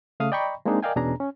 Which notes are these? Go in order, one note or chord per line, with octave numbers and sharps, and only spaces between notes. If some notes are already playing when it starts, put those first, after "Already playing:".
C#3 A3 F5 D#6
D5 D#5 G5 A#5 B5 C#6
G#3 A#3 C4 D4 D#4 G#4
A#4 D5 D#5 F5 G5 G#5
E2 B2 C#4 D4 G#4 A#5
C#4